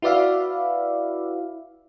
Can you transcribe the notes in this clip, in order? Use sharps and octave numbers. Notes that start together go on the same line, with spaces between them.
E4 F#4 B4 D5 E5 F5